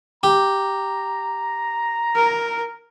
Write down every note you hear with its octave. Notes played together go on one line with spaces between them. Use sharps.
G4 A#5
A#4